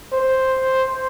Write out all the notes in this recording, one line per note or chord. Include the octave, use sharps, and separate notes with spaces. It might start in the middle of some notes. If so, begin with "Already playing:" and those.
C5